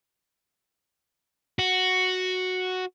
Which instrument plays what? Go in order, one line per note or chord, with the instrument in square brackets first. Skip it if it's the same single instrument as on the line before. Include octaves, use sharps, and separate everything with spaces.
[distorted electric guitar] F#4